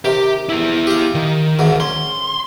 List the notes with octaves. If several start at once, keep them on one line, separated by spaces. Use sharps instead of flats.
C3 D#3 G4
E4 G#4
G4 F5
D#3
D2 G#2 D3
C#4 C6